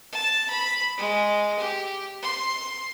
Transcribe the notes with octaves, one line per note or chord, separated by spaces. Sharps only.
A5
B5
G#3
G4
C6